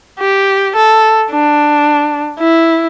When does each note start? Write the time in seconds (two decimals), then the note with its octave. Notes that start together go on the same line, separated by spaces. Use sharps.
0.20 G4
0.76 A4
1.31 D4
2.39 E4